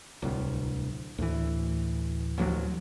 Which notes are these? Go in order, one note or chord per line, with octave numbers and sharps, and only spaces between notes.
D1 C2
D2 A2 E3
A1 D2 F3 F#3